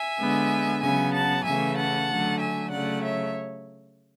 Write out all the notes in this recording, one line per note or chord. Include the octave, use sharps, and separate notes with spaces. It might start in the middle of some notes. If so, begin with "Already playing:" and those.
Already playing: E5 G#5
D3 G#3 B3
C#3 F#3 B3 E5 G#5
F#5 A5
C#3 E3 A3 E5 G#5
F#5 A5
D3 F#3 A3
E5 G#5
C#3 F#3 A3 D5 F#5
C#5 E5